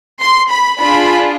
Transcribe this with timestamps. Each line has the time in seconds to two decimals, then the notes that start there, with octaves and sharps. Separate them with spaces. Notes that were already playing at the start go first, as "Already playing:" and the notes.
0.21 C6
0.51 B5
0.80 D4 F4 G#4 B5